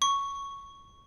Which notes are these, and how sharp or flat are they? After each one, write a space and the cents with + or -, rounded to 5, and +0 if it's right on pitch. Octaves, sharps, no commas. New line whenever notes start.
C#6 +0